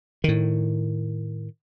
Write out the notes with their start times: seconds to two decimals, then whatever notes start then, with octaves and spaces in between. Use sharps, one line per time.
0.24 A2 D#3